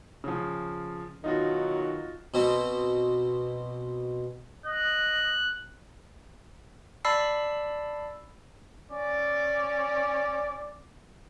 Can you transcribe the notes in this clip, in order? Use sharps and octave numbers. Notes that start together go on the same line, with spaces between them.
C#3 F3
B2 D#3 F#3 D#4 F4 F#4
B2 C4
D#5 F#6
D5 A5 B5 E6 C7
C#4 D5